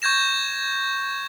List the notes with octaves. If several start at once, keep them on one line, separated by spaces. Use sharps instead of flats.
C#6 G6 G#6 A#6 E7